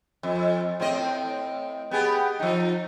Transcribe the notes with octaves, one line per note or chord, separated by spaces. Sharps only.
F2
A2 C4 D#5
B3 G4 G#4
F3 D#4